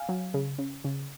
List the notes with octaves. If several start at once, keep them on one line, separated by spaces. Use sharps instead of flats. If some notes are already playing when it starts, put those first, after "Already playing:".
Already playing: F5 G#5
F#3
C#3
C#3
C#3